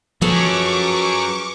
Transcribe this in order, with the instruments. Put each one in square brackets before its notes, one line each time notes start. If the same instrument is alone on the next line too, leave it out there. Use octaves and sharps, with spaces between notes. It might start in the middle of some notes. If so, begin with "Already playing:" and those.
[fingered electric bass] F3 [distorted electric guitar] F#3 C#4 [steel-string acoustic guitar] G#4 A4 B4 [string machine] C#6 D6